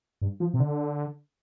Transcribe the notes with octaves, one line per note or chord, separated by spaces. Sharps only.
G2
F3
C3
D3